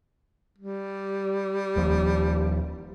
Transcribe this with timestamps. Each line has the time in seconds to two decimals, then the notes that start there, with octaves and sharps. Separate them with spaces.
0.58 G3
1.76 D#1 D#2 F3